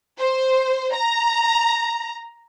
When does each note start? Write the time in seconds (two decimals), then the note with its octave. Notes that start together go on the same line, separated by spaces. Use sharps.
0.19 C5
0.93 A#5